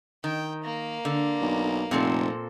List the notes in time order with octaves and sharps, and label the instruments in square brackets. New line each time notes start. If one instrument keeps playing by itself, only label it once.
[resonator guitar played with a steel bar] D#3 [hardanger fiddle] G5
[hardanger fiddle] A#3
[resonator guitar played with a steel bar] D3
[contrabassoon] B1
[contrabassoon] F1 [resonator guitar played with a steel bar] A#2 C4 A4